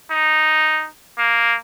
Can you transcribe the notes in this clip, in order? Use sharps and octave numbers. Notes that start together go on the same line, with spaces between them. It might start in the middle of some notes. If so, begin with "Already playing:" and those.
D#4
A#3